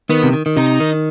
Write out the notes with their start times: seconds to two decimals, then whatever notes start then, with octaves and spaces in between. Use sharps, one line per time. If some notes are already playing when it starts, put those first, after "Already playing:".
0.10 D#3 B3
0.23 C3
0.33 D#3
0.46 D#3
0.57 C3 D#4
0.80 D#3